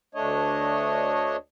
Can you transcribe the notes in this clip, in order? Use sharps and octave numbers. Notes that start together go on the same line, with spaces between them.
D2 A3 D4 C#5 D#5